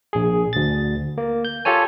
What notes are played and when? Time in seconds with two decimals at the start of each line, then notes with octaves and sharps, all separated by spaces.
0.13 A#1 G#4
0.53 D2 A6
1.18 A#3
1.45 G6
1.65 F4 G4 A4 C#5 G#5